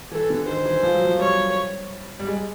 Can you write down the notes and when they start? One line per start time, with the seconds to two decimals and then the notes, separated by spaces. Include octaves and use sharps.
0.11 E3 A4
0.30 D3
0.47 D#3 C5
0.65 E3
0.83 F3
0.95 F#3
1.05 F3
1.19 G3 C#5
2.19 G3
2.27 G#3